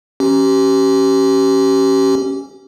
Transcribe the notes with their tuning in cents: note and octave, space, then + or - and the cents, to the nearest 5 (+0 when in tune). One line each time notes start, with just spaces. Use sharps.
C#4 -10 G4 -25